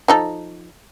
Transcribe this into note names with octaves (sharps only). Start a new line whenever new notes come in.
F3 D#4 A4